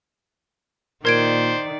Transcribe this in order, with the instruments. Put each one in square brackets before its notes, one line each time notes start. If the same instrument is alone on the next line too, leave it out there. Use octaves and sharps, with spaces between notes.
[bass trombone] A#2 [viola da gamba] D#3 D5 [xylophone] A#4 G#6 D7 [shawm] C5